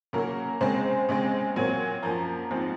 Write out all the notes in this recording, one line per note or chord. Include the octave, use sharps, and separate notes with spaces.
C#3 F#3 A#3 A#4
C#3 G#3 C4 C5
C#3 G#3 C4
A#2 F#3 C4 G#5
F#2 F3 A#3 A#5
G#2 F3 G#3 C4